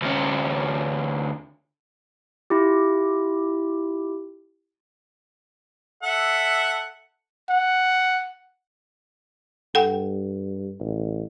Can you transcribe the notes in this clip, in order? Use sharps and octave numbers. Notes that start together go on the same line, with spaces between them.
D2 C#4
E4 F4 G4
A4 E5 F#5
F#5
G2 A4 F#5 G5
A1